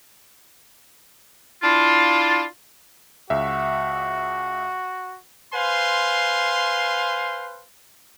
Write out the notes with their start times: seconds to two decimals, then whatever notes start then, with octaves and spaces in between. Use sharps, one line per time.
1.63 D4 E4 F4
3.30 C#2 F#4 E5
5.53 B4 C5 F5 G#5 C6